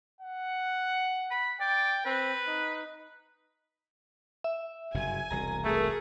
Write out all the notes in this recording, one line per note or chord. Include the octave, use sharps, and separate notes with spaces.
F#5
B5
D5 G5
C4 B4
D#4
E5
F#1 G2 C3 G#5
E1 C2 A#5
A3 G#4 A#4